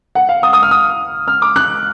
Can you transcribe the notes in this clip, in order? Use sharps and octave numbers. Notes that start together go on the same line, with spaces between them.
F#5
F5
D#6
D#6
F6
D#6
F6
D6
F#6